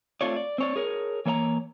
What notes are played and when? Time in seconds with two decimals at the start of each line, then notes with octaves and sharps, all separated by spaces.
0.21 A3 C4 F4 C#5 D5
0.36 D5
0.58 C4 C#5 D5
0.76 G#4 A#4 C#5
1.26 E3 A#3 C#5 D#5 A#5